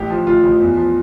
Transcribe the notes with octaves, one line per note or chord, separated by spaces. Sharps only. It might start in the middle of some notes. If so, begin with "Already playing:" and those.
Already playing: A1 G4
F3
A1 F4
A1
E2
F3